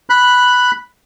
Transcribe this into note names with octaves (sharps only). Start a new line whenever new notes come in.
B5 F#6